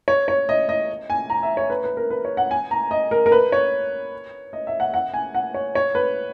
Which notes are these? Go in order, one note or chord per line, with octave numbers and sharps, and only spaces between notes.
C#5
C#5
D#5
D#5
G#5
A#5
E5
C#5
B4
B4
A#4
B4
C#5
F#5
G#5
A#5
D#5
A#4
A#4
B4
C#5
D#5
E5
F#5
F#5
G#5
F#5
C#5
C#5
B4